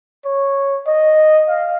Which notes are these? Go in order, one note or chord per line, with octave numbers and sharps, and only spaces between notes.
C#5
D#5
F5